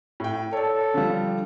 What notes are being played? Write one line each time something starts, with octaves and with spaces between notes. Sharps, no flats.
A2 G5
A4 C#5 D5
D3 F3 G3